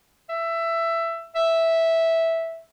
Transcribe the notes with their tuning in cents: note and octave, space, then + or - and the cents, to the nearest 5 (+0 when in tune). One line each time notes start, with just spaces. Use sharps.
E5 +15
E5 -5